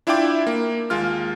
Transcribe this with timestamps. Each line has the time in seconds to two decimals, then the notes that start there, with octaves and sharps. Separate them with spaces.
0.07 D4 E4 F4 E5 G5 D6
0.47 A#3
0.90 D#2 G#3 F4 F6